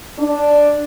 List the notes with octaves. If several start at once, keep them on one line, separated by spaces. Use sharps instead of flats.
D4